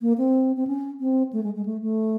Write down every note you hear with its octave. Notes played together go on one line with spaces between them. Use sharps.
A#3
C4
C4
C#4
C4
A3
G#3
G#3
A3
A3